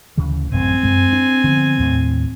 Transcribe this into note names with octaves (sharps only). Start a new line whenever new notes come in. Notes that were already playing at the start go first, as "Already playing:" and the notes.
D2 C#3 E3
D1 A1 F#2 C4 G#5
F#2 G#3
D4
D3 F3 B3
D#2 A2